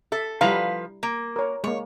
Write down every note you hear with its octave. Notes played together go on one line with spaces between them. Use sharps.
A4 E5
F3 G3 E4 B4 F5 A#5
A#3
A#4 C#5
G#3 A#3 C#5